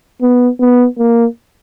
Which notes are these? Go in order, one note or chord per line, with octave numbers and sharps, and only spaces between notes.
B3
B3
A#3